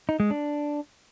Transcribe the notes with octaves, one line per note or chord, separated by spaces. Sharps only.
D#4
G#3
D4